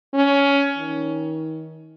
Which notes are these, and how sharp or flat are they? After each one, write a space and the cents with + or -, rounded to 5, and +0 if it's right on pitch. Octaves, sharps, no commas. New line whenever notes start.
C#4 +15
D#3 +35